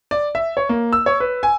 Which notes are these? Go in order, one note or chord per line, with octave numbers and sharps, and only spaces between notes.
D5
E5
C#5
A#3
E6
C#5
B4
G#5